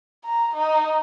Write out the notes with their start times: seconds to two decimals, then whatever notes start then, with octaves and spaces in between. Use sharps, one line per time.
0.24 A#5
0.55 D#4